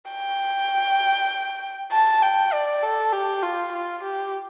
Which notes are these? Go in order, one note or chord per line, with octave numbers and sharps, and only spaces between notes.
G5
A5
G5
D5
A4
G4
F4
F4
G4